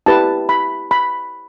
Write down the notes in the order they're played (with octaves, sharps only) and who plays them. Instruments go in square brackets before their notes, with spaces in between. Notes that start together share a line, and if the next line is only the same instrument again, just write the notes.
[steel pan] E4 G4 B4 A5
B5
B5